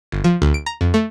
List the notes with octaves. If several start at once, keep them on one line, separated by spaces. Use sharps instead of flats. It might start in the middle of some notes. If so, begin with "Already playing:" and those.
G1
F3
D2
D7
A#5
F2
A3